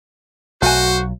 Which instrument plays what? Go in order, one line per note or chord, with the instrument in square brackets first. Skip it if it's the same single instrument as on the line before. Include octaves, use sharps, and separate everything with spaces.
[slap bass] B1 F#3 [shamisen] A3 G#5 [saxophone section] F#4 [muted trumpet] C5